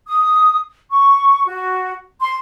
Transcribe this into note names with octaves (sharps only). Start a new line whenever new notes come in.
D#6
C#6
F#4
C6